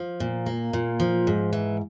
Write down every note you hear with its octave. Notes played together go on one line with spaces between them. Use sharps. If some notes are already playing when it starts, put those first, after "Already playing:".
Already playing: F3
A#2
A#3
A#2
F3
G#2
E3